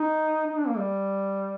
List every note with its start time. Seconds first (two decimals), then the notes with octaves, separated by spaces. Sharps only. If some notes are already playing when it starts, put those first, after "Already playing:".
Already playing: D#4
0.47 D#4
0.57 D4
0.68 A#3
0.78 G3